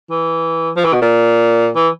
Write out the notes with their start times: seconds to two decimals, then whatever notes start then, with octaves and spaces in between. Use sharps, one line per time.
0.10 E3
0.77 F3
0.85 E3
0.93 B2
1.02 A#2
1.76 E3